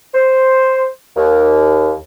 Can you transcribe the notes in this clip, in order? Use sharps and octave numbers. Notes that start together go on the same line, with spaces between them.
C5
D#2